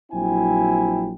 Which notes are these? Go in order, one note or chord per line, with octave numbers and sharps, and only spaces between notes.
A#1 F#3 C4 E4 G5 G#5